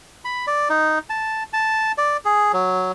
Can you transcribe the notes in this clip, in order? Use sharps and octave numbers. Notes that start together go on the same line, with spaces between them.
B5
D5
D#4
A5
A5
D5
G#4
F#3